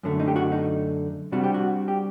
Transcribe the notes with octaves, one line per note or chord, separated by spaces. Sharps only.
F#2 D3 A3
D#4
G4
F#4
D#4
C3 G3 D4 F#4
G4
F#4
G4